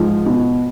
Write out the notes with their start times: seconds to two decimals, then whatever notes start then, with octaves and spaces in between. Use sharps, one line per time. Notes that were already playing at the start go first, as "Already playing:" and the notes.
Already playing: G#2 F3
0.26 B2